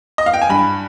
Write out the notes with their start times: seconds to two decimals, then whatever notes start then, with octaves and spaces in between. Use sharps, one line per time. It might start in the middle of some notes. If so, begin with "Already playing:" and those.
0.18 D#5
0.26 F5
0.33 G5
0.42 G#5
0.49 G2 B5